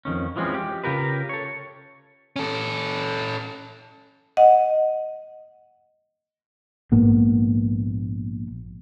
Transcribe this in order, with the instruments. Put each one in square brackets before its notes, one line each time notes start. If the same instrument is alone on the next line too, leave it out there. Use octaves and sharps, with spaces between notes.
[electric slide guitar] F2 B2 D#3 C#4
E3 F3 G#3 C4 C#4
G4
C#3 F4 G4 A#4 B4
A4 C#5
[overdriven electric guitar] C#4 A4
[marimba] D#5 F#5
[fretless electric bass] A#1 G#2 A#3 B3